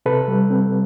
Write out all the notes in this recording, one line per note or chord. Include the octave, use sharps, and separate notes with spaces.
C3 A4 B4
G3
C4